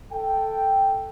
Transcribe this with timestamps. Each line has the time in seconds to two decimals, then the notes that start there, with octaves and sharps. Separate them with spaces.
0.12 A4 G5